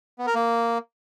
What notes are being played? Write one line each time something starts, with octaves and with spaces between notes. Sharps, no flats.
B3
A#4
A#3